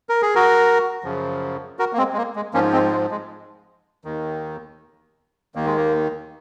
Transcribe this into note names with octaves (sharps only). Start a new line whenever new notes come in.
A#4
G#4
F#4 A#4
F#2 C#3 F3
F#4 A#4
A#3
G#3 C4
G#3
A#3
G#3
G#2 F3 A#3 C#4
G#3 C4
G#3
G#3
D#2 D#3
D#2 D#3 A#3
G#3
A#3